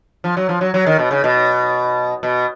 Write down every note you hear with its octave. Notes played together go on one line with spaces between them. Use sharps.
F3
F#3
F3
F#3
F#3
D#3
B2
C#3
B2
B2